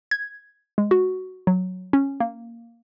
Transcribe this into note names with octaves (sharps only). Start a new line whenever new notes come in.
G#6
G#3
F#4
F#3
C#4
A#3